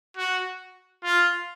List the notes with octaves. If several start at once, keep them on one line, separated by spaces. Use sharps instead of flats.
F#4
F4